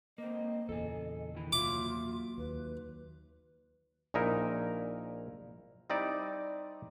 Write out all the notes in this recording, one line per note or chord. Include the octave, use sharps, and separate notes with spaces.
A#3 C4 D#5
E2 A#2 C#3 A4 G#5
D#3 E4
F#3 A#3 F4 E5 D6
D#2 B4
A#1 A#2 D#4 E4 A#4
G3 C4 D#4 E4 D5